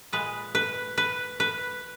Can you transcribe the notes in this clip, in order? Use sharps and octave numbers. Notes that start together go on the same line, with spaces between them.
A#2 G#3 B4
B4
B4
B4